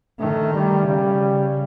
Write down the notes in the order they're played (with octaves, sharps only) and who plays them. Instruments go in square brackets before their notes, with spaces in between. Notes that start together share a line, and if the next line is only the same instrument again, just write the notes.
[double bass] D#3 [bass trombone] A3
[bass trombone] G3
[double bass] C#3 [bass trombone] G3